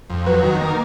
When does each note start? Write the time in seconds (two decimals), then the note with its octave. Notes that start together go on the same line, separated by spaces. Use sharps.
0.10 F2
0.26 F#3 B4
0.43 D#3
0.61 A#3